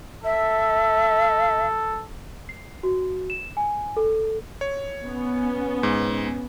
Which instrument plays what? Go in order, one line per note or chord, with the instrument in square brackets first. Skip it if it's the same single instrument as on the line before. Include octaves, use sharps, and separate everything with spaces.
[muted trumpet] A4 [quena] E5
[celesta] C7
F#4
E7
G#5
A4
[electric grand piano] C#5
[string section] B3 C#4
[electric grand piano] G#2